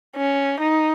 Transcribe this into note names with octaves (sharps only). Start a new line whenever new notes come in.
C#4
D#4